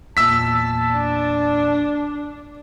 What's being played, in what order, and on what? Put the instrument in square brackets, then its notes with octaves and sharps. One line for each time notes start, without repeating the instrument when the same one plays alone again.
[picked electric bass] E2 A#2 [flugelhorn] A5 [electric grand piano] E6 B6
[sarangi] D4